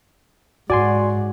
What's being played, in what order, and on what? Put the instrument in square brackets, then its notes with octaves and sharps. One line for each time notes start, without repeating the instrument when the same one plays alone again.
[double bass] G#2 [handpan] F#4 [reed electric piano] D5 G#5 C6